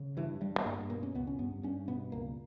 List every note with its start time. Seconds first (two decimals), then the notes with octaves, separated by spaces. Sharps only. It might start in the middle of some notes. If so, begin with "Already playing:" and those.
Already playing: C#3
0.17 G2 E3
0.41 G2 G3
0.60 B3
0.66 G2 A#3
0.90 B2 A#3
1.03 C#4
1.15 C#2 B3
1.27 C#4
1.39 G2 B3
1.63 G2 C#4
1.88 B2 B3
2.12 C#2 A#3